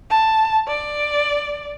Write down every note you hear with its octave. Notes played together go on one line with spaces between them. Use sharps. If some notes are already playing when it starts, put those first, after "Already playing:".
A5
D5